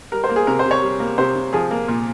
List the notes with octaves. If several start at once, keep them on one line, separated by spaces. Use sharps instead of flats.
G3 A#4
C5
A#3
G#4
C3 A#4
C5
C3
C#5
G3
A#3
C3 C5
C3
F3 G#4
A#3
A#2